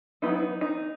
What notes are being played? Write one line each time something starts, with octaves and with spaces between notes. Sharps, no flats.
F#3 B3 D#4 E4
D#4
D#4